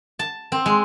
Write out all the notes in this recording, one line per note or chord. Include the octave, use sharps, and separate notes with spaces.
A5
C4
G#3